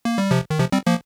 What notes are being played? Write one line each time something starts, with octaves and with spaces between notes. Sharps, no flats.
A#3
G3
C3 F3
D#3
C3 F3
G3 C4
F3 A#3